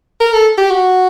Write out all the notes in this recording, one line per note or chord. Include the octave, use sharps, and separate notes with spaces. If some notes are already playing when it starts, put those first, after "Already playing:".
A#4
A4
G4
F#4